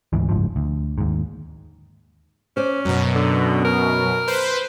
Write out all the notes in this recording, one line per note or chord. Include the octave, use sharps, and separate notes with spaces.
D2 G#2 E3
F#1 D2 G#2 F3
D2
D#2 G#2
C#4 C5 D5
F#2 B2 F#3
D3
A#4
B4 C5